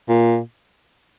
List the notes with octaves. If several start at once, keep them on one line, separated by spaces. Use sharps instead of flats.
A#2